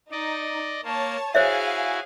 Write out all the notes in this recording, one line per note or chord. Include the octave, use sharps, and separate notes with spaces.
D#4 D5 D#5
A#3 C#5 A5
E4 F#4 G#4 C5 C#5 E5 F5 G#5